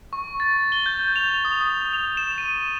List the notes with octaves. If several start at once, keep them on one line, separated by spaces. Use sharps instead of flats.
C#6
A6
G7
G6
F7
D#6
D#6
F7
E7
D#7